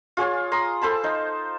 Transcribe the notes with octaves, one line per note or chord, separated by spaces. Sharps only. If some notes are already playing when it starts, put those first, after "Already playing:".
F4 G#4 C#5 G#5
A#5 C6 D#6
A4 C5 A5 B5
D#4 C5